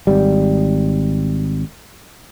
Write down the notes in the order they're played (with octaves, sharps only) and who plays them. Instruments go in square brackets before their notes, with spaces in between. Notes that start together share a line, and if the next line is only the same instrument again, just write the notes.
[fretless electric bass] G#1 G3